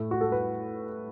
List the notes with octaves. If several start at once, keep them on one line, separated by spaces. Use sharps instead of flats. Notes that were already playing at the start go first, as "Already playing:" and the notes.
Already playing: A2 A3
F#4
A4
B4